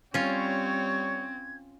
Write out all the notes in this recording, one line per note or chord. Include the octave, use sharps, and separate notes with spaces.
G3 C4 C#4 F4 C#5 G#6